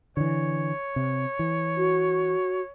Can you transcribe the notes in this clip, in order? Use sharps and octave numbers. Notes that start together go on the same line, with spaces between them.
D3 E3 C#5
C3
E3
F#4